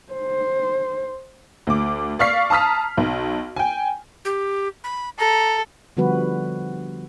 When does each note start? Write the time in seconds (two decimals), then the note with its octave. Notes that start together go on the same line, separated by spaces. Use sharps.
0.12 C5
1.67 D2 D6
2.19 D5 F5 C#6 F6 B6 C7
2.50 A5 A#5 D#6 F6 B6
2.97 B1
3.56 G5 G#5
4.25 G4
4.84 B5
5.19 A4 A#5
5.97 D3 F3 G3 B3 F#4 B4